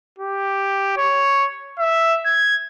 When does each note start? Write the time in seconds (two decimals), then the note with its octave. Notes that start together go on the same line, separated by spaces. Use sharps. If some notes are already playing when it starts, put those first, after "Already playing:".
0.19 G4
0.97 C#5
1.79 E5
2.25 G#6